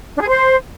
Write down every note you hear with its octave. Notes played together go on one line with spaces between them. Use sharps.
D4
G#4
C5